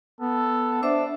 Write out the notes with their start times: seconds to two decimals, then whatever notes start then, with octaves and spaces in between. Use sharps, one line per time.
0.21 B3 A4
0.83 D4 C5 D5 E5